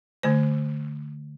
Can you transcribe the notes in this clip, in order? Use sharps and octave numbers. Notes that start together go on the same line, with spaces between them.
D3 A3 C5